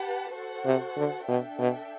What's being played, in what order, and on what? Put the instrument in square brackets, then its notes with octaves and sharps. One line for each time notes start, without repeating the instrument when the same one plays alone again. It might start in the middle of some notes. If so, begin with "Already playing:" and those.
Already playing: [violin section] G4 B4 F#5 A5
F#4 A4 C5 F#5
[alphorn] C3
D3
[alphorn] B2 [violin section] D4 A4 E5 G5
[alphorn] B2